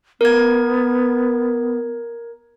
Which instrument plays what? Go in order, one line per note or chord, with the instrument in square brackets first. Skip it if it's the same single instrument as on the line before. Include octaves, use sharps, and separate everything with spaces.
[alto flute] B3 [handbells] A#4 G#6